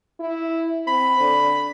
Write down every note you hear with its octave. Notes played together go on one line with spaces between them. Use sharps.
E4
C4 B5
D3